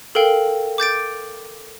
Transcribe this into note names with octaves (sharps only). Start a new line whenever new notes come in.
A4 A#4 F5 G5
D6 G6 A6 D7